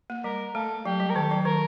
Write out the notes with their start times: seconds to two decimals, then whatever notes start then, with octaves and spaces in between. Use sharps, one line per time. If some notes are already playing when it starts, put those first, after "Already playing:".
0.10 A#3
0.24 G3 A#4
0.54 A3 A4
0.86 F#3 G4
1.00 G3
1.10 A#4
1.15 D#3 A4
1.31 F#3
1.45 D#3 A#4